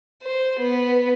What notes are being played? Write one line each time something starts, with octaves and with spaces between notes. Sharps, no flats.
C5
B3